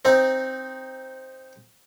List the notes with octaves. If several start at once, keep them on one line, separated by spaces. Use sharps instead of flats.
C4 D#4